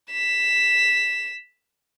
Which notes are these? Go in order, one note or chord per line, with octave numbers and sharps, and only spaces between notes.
B6 E7